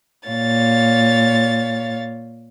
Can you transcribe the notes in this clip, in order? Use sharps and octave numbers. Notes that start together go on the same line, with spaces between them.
A#2 C#5 F5 A6